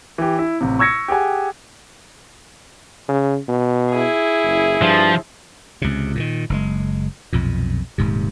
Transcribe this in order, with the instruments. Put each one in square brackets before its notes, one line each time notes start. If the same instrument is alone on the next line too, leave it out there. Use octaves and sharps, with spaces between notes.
[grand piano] E3 G4
E4
A1 C3
C#6 E6 G#6 A#6 C#7
G4 G#4 F#5 G#5
[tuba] C#3
B2
[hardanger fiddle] E4 G#4
[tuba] F#1
[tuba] G2 [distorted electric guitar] F3
[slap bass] C#2 C3
A#2 D3 D#3
F#1 B2 G#3
B1 F2 A#2
D#1 G#2 C3